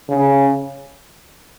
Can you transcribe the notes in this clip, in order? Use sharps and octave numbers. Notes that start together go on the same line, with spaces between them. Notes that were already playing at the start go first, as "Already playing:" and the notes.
C#3